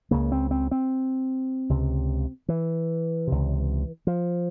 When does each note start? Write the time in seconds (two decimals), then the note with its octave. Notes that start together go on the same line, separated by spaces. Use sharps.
0.11 C#2 C#3 A#3
0.32 C4
0.51 C4
0.71 C4
1.69 C#2 C3
2.48 E3
3.27 C#2 C3
4.07 F3